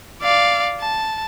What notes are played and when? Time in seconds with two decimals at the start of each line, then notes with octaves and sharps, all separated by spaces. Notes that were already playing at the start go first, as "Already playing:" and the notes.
0.23 D5 F5
0.80 A5